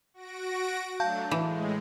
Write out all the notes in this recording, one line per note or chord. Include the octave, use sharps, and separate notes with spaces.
F#4 A#6 D7
F#3 A3 D4 F5 A5 G6
A2 E3 G#3